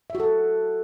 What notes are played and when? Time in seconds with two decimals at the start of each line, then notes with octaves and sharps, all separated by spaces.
0.10 E5
0.15 F#4
0.20 A4